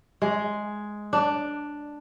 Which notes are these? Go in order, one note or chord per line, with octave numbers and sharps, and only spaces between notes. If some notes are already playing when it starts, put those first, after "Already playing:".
G#3
D4